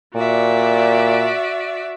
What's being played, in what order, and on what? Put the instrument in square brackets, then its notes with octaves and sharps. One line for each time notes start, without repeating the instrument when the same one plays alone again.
[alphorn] A#2 [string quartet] F#4 D5 E5